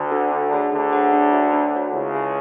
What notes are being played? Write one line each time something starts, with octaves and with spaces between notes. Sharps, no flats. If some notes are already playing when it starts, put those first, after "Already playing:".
Already playing: D2 D3
D4 F#4 A4
D4
G#4 C#5 F#5 A5
D2 D3 D4
G#4 C#5 F#5 A5
D4
F#4 C#5 E5
D4
F#4 C#5 E5
C#2 C#3 E4
G#4 C#5 E5 A5